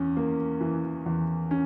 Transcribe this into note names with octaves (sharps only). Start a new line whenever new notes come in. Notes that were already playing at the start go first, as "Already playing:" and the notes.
Already playing: E2 C#4
A#3
E3
E2
C#4